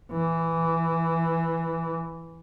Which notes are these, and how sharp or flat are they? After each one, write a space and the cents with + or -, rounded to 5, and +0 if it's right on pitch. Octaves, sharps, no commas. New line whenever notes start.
E3 +5